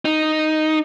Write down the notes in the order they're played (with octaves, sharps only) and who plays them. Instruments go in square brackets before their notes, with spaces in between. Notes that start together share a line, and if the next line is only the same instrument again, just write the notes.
[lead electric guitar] D#4